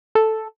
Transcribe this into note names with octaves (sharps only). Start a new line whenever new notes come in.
A4